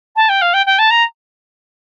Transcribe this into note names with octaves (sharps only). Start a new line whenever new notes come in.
A5
G5
F5
G5
G5
A5
A#5